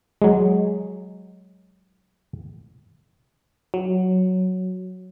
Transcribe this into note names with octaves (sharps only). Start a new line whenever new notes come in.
F#3 G#3
F#3